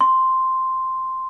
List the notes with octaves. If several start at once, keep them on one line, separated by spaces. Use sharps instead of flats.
C6